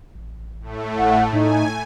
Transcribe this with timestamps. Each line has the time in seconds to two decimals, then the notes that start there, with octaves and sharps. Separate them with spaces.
0.15 A1
0.60 A2 A3
0.98 G#1 F#5
1.33 A2 D#4 G#5